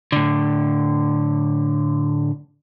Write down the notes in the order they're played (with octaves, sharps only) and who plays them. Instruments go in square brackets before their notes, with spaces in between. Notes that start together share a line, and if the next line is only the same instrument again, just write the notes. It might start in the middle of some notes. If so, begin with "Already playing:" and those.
[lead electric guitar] A2 D3